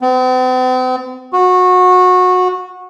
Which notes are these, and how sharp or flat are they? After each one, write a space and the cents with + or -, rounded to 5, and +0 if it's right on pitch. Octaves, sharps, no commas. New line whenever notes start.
C4 -45
F#4 -20